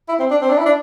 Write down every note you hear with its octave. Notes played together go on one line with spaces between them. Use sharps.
E4
C4
D4
C4
D4
E4
D4